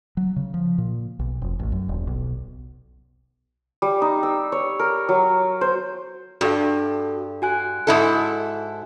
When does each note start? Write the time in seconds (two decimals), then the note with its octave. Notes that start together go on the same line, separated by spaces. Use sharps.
0.17 F#3
0.36 C#3
0.54 F3
0.78 A#2
1.19 B1
1.42 F1
1.59 A1
1.72 F#2
1.89 D#1
2.07 B1
3.82 G3
4.02 D#4
4.23 E6
4.52 C#5
4.79 A#4
5.09 F#3
5.61 C5
6.41 G2 F#4 A4 F5
7.42 F#4 G#5 F#6
7.87 G#2 E4 A4